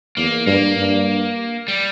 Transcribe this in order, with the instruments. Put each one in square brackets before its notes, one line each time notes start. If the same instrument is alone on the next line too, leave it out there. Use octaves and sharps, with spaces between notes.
[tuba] E2 [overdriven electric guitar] A#3
[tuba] G2 [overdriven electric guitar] A#3
[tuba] G2
[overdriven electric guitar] G3